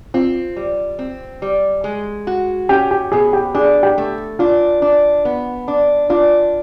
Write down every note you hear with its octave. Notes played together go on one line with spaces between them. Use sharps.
C4 F4
G3
C4
G3
G#3
F#4
C#4 G4
G4
B2 G#4
G4
D4 G#4
G4
A3
D4 F4
D4
B3
D4
D4 F4